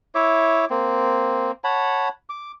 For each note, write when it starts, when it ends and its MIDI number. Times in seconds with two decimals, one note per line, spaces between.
0.15 0.65 64
0.15 0.65 73
0.15 0.65 76
0.15 0.65 86
0.70 1.51 58
0.70 1.51 60
1.64 2.09 73
1.64 2.09 78
1.64 2.09 81
1.64 2.09 83
2.29 2.52 86